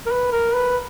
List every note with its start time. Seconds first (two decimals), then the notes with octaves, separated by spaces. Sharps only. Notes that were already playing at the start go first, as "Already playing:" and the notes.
0.06 A#4
0.11 B4
0.32 A#4
0.54 B4